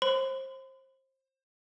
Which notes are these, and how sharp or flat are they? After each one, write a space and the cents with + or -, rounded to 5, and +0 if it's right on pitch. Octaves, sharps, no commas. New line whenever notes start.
C5 +25 C6 -45